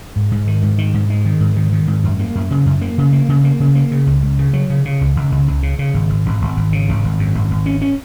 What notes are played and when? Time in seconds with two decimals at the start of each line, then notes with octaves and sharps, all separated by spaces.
0.16 G#2
0.32 G#2
0.47 D#3
0.63 G#2
0.78 D#3
0.94 G#2
1.10 G#3
1.25 D#3
1.41 G#2
1.56 D#3
1.73 D#3
1.87 G#2
2.04 F#2
2.20 A#3
2.35 F#2
2.51 C#3
2.66 F#2
2.81 A#3
2.98 C#3
3.13 A#3
3.29 C#3
3.44 A#3
3.60 C#3
3.75 A#3
3.91 C#3
4.06 C#2
4.23 C#2
4.39 C#3
4.53 F#3
4.70 C#3
4.85 C#3
5.01 C#2
5.16 C#2
5.32 C#2
5.48 C#2
5.63 C#3
5.79 C#3
5.94 G#1
6.10 G#1
6.26 G#1
6.42 G#1
6.57 G#1
6.72 C#3
6.89 G#1
7.04 G#1
7.19 F#2
7.35 G#1
7.51 G#1
7.66 C#4
7.82 C#4